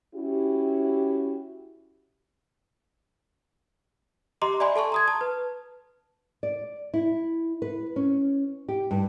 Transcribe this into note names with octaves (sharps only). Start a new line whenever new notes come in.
C#4 E4 F#4 G4
G4 D#5 A#5 C6 D6
D5 E5 G#5 B5 C6
A4 A5 C6 C#6
A#5 D#6 G#6
A5
B4
D5
E4
B4
C#4
G4
G2